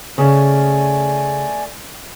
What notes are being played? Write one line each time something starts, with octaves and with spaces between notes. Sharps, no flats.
C#3 A3 D5 G#5